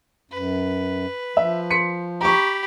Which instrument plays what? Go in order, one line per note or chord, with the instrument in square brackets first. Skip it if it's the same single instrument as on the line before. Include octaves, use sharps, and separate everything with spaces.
[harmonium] F#2 [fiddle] B4
[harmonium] F3 [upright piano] E5
[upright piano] C6 B6 C#7
[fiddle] G4 B5 [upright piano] A#5 C#6